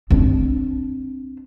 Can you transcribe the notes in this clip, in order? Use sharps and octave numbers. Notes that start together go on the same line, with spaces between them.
C4 D4